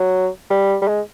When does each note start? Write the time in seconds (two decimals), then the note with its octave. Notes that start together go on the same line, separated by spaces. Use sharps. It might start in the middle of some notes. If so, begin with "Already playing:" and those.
Already playing: F#3
0.50 G3
0.82 G3
0.88 G#3